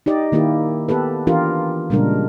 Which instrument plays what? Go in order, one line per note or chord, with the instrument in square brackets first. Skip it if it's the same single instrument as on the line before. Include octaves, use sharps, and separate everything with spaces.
[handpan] D#4 G4 D5 D#5
D#3 A#3 E4 G4
B3 G4 A4 B4
E3 D4 F4 G4 A#4
A#2 C#3 G3 G#3 D4 A#4